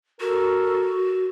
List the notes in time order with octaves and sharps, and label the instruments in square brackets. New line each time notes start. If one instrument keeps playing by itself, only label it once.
[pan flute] F#4 [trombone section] A4 A#4